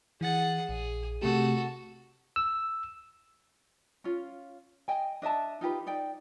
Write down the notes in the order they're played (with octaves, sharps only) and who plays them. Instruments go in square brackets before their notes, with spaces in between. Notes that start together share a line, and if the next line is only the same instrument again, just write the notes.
[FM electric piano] E3 A6 [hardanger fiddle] G#4 F#5
[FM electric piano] A#1 [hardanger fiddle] G#4
[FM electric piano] C3 A3 G4 [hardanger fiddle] F#4 A4
[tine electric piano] E6
[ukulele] C#4 F4
D#5 G5 G#5
D4 D#5 E5 A5
D#4 F4 G4 B4
D#4 D5 G5